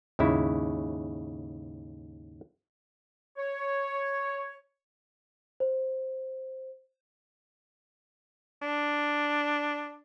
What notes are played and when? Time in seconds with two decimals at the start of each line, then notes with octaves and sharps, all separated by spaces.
0.19 D#2 G#2 C#3 E4
3.37 C#5
5.60 C5
8.62 D4